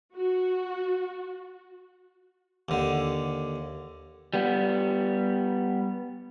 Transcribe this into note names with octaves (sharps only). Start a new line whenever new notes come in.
F#4
D#2 D3
G3 B3